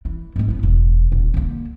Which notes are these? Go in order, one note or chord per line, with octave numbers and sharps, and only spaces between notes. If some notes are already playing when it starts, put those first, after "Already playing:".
E3
G#2 A3
F3 B3
E1
D#1
D3 A#3